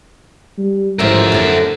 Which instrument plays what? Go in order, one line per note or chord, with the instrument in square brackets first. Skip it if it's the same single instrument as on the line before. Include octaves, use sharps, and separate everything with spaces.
[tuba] G3
[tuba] A1 [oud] D2 G#2 F3 [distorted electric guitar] A#4 E5
[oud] F#2 D3